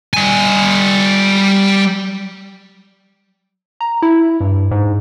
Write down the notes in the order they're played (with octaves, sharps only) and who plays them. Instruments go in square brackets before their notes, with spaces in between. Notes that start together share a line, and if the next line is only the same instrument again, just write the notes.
[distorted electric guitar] G3 G#5
[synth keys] A#5
E4
G2
G#2